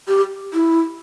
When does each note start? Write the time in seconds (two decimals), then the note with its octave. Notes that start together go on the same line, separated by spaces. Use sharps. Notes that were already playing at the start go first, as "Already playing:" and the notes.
0.08 G4
0.53 E4